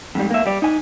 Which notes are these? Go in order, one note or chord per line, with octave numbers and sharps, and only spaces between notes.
F2 G#2 G3
A#3 E5
G3 D5
D#4 G#5